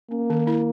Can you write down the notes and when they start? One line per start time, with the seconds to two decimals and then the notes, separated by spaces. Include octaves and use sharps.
0.11 A#3 C#4
0.30 D#3
0.47 E4